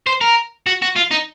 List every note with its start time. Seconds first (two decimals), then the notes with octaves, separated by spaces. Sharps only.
0.07 C5
0.21 A#4
0.67 F#4
0.82 F#4
0.96 F4
1.11 D#4